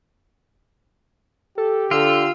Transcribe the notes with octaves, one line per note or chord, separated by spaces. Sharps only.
G4 A4
D3 F4 E6